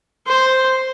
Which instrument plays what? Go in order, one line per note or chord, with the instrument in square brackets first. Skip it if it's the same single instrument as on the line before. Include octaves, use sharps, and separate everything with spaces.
[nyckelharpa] C5